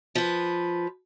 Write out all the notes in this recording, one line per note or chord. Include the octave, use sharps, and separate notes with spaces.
F3 B4